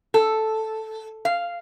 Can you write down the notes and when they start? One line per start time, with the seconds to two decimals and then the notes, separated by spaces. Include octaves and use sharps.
0.14 A4
1.25 F5